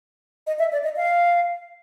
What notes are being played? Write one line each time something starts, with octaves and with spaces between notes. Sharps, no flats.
D#5
E5
D5
D#5
F5